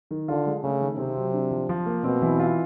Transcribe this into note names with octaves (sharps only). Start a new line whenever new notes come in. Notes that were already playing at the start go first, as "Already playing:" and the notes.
D#3
D3 F4
G#3
C#3 A3
D#3
C3 C4
F#3
D4
F3
F3
A#3
B2 C4
E3
F4